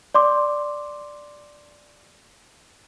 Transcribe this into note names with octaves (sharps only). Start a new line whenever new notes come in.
D5 C6 D6